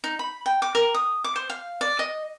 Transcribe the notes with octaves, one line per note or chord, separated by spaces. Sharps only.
D#4
B5
G5
D6
A#4
D#6
D6
C5
F5
D5
D#5